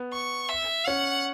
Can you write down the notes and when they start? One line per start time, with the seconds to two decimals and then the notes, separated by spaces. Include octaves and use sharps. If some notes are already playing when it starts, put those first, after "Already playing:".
Already playing: B3
0.13 C#6
0.49 E5
0.87 C#4 F#5